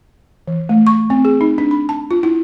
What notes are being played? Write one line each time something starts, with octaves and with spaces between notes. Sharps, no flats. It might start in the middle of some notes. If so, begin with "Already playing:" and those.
E3
A3
C#6
C4
G#4
D#4
D4
B5
A5
F4
E4